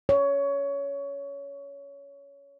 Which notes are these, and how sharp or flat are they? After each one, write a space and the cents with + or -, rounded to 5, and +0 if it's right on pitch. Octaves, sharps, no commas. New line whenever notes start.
C#5 +15